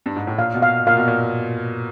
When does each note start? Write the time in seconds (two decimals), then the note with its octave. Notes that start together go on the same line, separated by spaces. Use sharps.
0.06 G2
0.16 G#2
0.27 A2
0.38 A#2 F5
0.54 B2
0.62 F5
0.87 A#2 F5
0.97 B2
1.07 A#2